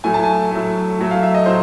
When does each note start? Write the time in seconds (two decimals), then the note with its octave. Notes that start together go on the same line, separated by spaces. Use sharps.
0.04 A2 F#3 A3 G#5
0.14 A5
0.24 G#5
0.51 A2 F#3 A3
0.99 A2 F#3 A3
1.11 F5
1.23 E5
1.34 D#5
1.46 A2 F#3 C5